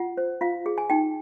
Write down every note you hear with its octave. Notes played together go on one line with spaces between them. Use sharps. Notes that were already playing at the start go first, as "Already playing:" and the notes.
Already playing: F4 F#5
C5
F4 F5
G#4
G#5
D#4 G5